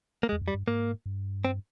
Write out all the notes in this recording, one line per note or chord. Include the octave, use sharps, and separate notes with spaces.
A#3
G#3
E2
F2
G3
G2
G#2 A#3
G2
C4